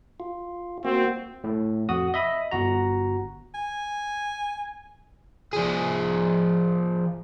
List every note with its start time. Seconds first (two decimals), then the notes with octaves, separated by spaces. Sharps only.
0.20 F4
0.85 A#3 C4 F#4
1.44 A2
1.89 F2 F#4 D#6
2.14 D#5 E5 B5 D#6
2.51 G1 F#4 A#5
3.54 G#5
5.53 F3 G#4